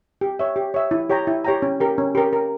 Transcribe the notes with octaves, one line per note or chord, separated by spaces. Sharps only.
G4
C#5 E5
G4
C#5 E5
E4
G4 C#5 G5 A#5
E4
G4 C#5 G5 A#5
C#4
G4 A#4
C#4
G4 A#4
A#4